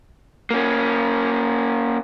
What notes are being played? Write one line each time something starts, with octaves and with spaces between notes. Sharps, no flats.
A#3 C#4